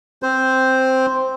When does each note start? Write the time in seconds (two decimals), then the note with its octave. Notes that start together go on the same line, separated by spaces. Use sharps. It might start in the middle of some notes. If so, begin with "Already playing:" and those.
0.23 C4 C5